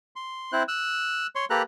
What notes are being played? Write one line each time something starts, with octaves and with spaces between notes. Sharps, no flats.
C6
C4 E4 C5 F#6
E6 F#6
C#5 C6
A#3 G4 A4 B4 A#5 F#6